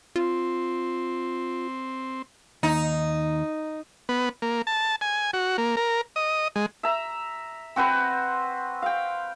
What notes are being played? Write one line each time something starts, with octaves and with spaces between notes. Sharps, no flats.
C4 F4
D#2 D#4
B3
A#3
A5
G#5
F#4
A#3
A#4
D#5
G#3
E5 A#5
C4 F#4 B4 C5
F5 G5